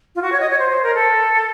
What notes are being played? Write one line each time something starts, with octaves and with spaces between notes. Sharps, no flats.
F4
F#4
C#5
D#5
C#5
C5
C5
A#4
A4